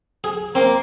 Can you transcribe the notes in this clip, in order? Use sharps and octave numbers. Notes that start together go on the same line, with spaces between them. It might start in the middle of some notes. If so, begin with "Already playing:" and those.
G#4
A#3 C4